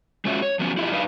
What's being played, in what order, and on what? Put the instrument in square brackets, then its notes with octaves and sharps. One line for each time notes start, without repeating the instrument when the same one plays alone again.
[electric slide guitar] G#3 C#4 F4 F#4 E5
C#5
F3 F#3 B3 C#4
E4 F4 G4 D#5
F#2 D4 D#4 B4 D#5 F5